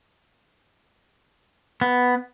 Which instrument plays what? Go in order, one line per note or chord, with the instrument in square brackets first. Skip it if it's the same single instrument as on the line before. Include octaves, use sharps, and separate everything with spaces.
[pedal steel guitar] B3